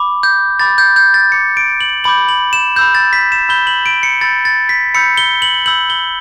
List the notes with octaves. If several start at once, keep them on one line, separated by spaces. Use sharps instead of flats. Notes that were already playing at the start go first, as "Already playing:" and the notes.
Already playing: B5 D6
G6
B5 D6 G6 A6
G6
G6
A6
B5 D6 G6 C#7
D7
F#7
B5 D6 G6 F#7
F#7
E7
B5 E6 G6
A6
B6
E7
B5 E6 G6 G7
F#7
D7
C#7
B5 E6 G6 A6
A6
B6
B5 E6 G6 C#7
G7
F#7
B5 E6 G6 F#7
G7